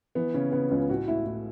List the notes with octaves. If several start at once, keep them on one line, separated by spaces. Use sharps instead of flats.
E3 B3
C#3 C#4
C#3 B3
C#2 C#4
A1 F#4
A2 E4
A2